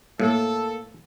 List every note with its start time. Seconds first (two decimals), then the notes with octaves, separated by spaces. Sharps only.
0.20 A2 A#3 A4